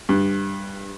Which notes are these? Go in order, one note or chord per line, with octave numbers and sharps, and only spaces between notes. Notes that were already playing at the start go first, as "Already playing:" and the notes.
G2